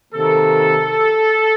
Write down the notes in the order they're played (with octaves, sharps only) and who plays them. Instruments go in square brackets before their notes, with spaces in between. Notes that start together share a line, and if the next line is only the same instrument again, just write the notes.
[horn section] C3 D#3 A#3 A4